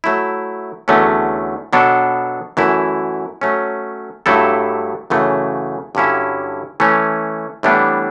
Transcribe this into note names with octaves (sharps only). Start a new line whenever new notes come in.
F#3 A3 E4
E2 D3 F#3 A3 C#4
B2 F#3 B3 D4 A4
F#2 E3 A3 E4
F#3 A3 C#4
G2 F#3 A3 E4 A4
F#2 C#3 E3 A3
G2 D3 F#3 C#4 E4
E3 A3 C#4
A2 E3 G3 B3 D4